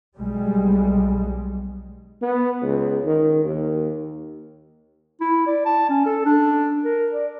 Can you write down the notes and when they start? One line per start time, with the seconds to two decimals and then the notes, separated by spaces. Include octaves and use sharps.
0.17 B1 G3 G#3
2.22 B3
2.62 C#2
3.05 D#3
3.44 D#2
5.21 E4
5.46 D5
5.65 A5
5.89 C#4
6.06 A4
6.25 D4
6.85 A#4
7.12 D5